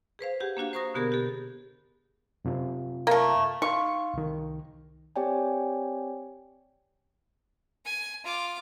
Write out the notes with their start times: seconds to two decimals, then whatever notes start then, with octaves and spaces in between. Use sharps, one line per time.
0.19 G#4 B4 C5 F5
0.40 G4 G#4 F#5
0.57 A#3 D4 F#4 F5
0.73 C5 A#5 C#6 D#6 A#6
0.94 B2 D3 B3 G4 G#4 A#4
1.12 G4 A4
2.45 F#2 C3 F4
3.07 A3 A#3
3.62 D#4 F5 C6 C#6
4.14 C2 D#3
5.16 C4 G4 C#5 D5 G5 G#5
7.85 G#5
8.24 F4 D6